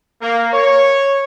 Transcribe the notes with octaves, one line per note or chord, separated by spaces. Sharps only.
A#3
C#5